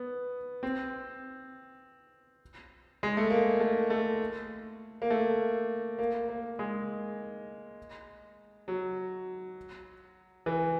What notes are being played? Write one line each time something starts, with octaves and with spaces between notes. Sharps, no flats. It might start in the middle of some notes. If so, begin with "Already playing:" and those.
Already playing: B3
C4
G#3
A3
A#3
A3
A3
A#3
A3
A#3
A#3
G#3
F#3
E3